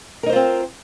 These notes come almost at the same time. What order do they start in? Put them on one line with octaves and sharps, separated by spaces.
A#4 D#4 C5 F4 C4